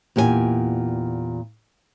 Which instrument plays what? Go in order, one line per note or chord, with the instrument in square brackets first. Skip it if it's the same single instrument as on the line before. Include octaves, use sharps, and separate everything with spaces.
[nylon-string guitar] E2 A#2 G4 A4 G#5